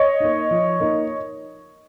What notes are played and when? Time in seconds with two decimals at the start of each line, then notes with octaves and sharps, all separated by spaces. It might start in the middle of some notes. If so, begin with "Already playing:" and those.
Already playing: C#5 D#5
0.20 A#3 D#4
0.51 F3
0.80 A#3 D#4